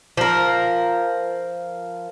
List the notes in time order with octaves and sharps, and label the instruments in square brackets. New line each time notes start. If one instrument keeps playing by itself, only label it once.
[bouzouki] F3 A#4